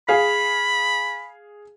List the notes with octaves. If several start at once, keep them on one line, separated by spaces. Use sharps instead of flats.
G#4 F5 B5